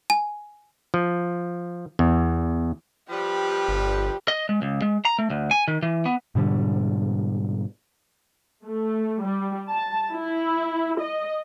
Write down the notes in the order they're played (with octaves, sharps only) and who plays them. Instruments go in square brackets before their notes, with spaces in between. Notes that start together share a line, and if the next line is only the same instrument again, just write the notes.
[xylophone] G#5
[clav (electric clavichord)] F3
E2
[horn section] F3 G3 B4 [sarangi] G4
[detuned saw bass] G1
[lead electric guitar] D#5
G#3
C#2
G#3
A#5
A3
D2
G#5
D#3
E3
B3
[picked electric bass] G#2 B2 D3 G3
[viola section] A3
G3
A5
E4
D#5